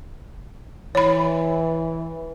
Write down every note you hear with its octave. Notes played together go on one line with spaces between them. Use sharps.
E3 C#5 B5